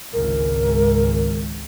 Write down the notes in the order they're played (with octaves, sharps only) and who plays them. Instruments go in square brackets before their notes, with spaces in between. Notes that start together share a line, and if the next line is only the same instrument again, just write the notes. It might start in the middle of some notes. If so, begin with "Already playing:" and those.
[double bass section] G#1 C#2 [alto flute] A#4